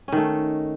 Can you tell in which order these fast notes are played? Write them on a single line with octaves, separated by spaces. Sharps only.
C#4 D#3 A3